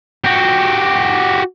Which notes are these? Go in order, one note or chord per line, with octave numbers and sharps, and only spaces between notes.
F#4 G4